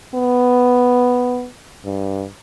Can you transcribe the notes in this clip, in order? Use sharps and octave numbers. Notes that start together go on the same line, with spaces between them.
B3
G2